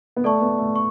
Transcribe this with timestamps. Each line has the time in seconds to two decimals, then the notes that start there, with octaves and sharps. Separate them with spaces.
0.16 B3
0.24 A3 A4 D5 A5 C#6
0.41 B3
0.58 A3
0.76 C#6